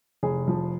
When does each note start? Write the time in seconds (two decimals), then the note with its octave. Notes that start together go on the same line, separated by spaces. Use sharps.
0.23 F1 G#4
0.48 F3